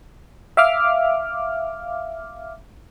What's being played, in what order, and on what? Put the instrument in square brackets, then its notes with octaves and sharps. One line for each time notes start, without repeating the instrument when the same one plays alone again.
[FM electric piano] E5 F5 D6 F6